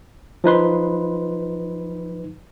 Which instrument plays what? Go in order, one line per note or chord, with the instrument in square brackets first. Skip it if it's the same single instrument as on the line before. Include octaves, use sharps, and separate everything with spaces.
[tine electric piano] F3 D#4 B4 C6